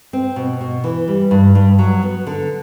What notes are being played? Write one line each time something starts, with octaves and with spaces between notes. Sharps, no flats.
C4
B2
B2
E3
G3
G2
G2
F#3
B3
D3